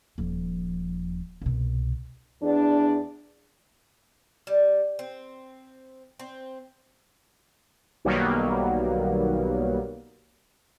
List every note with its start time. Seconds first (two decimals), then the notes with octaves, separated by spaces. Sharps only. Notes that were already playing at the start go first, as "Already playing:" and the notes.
0.18 D#1 F3
1.42 C2 B2
2.42 E2 D4
4.47 G3
4.99 C4
6.19 C4
8.05 B1 D#3 F#3 G3 A#3 B3